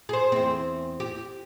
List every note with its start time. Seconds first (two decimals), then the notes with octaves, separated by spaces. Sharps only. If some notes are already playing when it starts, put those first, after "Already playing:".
0.09 G#4 C5
0.32 E2 C4
1.00 G4